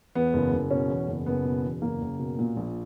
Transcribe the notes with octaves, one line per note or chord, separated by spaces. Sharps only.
E2 B3
F#1
F#1
B2 C#4
E2
F#1
F#1 B3
B2
E2
F#1 A#3
F#1
B2
A#2
A#1